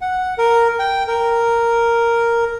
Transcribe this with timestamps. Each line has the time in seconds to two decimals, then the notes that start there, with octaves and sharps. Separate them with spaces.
0.01 F#5
0.38 A#4
0.79 G5
1.08 A#4